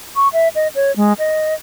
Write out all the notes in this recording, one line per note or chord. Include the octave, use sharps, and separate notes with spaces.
C#6
E5
D#5
C#5
G#3
D#5